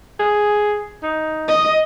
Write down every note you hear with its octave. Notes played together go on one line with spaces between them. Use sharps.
G#4
D#4
D#5